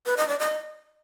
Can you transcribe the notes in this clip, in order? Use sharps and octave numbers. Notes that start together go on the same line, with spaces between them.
B4
D#5
D5
D#5